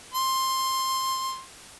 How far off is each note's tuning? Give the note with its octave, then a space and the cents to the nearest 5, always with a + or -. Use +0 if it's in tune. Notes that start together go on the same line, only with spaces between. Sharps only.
C6 +10